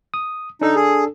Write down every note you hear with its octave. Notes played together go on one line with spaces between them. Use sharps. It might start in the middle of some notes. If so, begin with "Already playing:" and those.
D#6
D4 D#4 A4
G#4